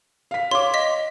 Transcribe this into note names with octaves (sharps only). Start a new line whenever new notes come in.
F5 B6
C#5 F5 C6 D6
D#5 B6